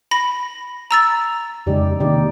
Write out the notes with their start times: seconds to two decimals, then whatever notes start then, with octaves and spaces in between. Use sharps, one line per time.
0.11 B5 A#6
0.91 A#5 E6 A6
1.67 F2 C#3 G#3 D#4 G4 D5
2.00 C3 D#3 A#3 D#4 G4 D5